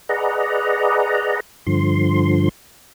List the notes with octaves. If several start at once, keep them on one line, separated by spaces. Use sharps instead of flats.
G#4 B4 D5 D#5 F#5 A#5
G2 D3 F3 C6